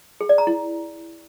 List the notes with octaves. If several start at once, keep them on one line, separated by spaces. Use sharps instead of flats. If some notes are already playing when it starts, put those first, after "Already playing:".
G#4
D5
A#5
E4